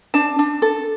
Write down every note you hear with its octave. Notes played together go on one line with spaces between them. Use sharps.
D4 A5
D4
A4